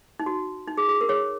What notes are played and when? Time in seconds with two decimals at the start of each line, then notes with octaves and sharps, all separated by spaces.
0.20 D#4
0.26 F#4
0.68 D#4
0.77 G#4
0.89 G#4
1.01 A#4
1.09 G#4 C#5